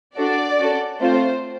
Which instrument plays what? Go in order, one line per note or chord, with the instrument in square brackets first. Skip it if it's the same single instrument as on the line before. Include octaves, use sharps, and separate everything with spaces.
[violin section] D4 F#4 A4 D5
C#4 F#4 A4
A3 C4 F4 A4 C5